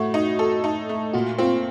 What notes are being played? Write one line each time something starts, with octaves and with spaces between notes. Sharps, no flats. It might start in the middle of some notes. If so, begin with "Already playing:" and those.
Already playing: A2 A3 F#4
D#4
A4
D#4
A3
A#2 F#4
C4 F4